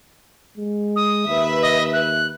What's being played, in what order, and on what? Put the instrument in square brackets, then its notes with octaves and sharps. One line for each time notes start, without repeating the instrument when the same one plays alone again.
[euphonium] G#3
[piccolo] D#6
[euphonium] D#2 [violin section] B4 E5
[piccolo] D#5
F#6